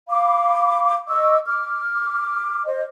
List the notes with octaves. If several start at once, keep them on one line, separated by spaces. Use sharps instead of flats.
F5 B5 D6
D#5 C#6 D6 E6
D6 F6
C5 D#5